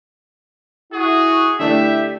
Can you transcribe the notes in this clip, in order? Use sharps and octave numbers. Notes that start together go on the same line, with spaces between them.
E4 F#4 G#4
D3 A3 D4 E4 G4 E5